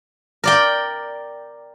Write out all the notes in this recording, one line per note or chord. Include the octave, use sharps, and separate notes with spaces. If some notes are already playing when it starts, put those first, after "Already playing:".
A#4 D5 G5